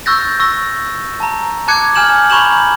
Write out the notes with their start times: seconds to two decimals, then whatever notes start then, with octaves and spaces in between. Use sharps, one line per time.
0.06 C#6 E6 F#6 G6 A6 A#6
0.40 C#6 E6 A#6
1.20 A5 A#5
1.68 A5 D6 F#6 G#6 C#7
1.95 G#5 F6 G6 E7 F#7
2.30 A#5 B5 C#6 G6 E7 F#7